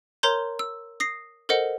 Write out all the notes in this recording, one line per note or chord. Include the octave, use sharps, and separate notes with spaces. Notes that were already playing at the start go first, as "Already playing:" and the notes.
A#4 C#5 A#5 C6 G6
E6
D#6 A#6 C7
A4 A#4 C5 D#5 F#5